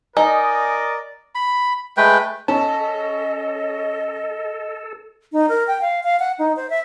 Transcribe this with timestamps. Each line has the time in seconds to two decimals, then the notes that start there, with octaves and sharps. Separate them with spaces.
0.17 D#4 A#4 D5 D#5 G#5
1.35 B5
1.97 G#3 A3 B4 G5
2.48 C#4 A4 D#5 A5
5.32 D#4
5.49 A#4
5.67 G5
5.81 F5
6.03 F5
6.19 F#5
6.39 D#4
6.56 C5
6.70 E5